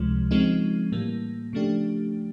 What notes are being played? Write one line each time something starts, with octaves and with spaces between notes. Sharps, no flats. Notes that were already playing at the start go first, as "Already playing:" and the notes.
Already playing: C#2 C3 F3 G#3
C#3 F3 G#3 C4 D#4
A2 E3 G3 A#3
C#3 F3 A3 D4 G4